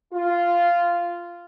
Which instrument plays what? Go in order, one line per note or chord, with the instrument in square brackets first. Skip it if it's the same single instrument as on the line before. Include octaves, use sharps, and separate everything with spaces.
[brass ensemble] F4